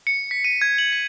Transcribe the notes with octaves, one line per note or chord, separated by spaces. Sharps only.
C#7
B6
D#7
G#6
F#7
B6